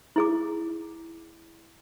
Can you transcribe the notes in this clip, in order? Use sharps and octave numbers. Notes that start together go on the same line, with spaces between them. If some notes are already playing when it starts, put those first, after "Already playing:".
E4 G#4 D6